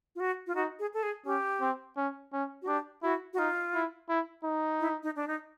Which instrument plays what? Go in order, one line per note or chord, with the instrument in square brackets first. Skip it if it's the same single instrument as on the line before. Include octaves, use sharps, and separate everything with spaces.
[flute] F4
F#4
F4
[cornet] D#4 [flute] F#4
[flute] G#4
A4
G#4
[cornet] C#4 [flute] G4
[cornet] C4
C#4
C#4
[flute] F#4
[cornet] D4 [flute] G4
[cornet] E4 [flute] F#4
[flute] F#4
[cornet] D#4 [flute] F4
[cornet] E4
E4
D#4
[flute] E4
D#4
D4
D#4